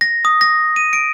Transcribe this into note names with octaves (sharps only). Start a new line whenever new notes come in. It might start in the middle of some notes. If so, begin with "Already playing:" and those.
A#6
D#6
A#6
D#7
D7